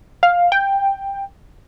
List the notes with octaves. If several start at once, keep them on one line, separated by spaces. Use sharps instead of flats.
F5
G5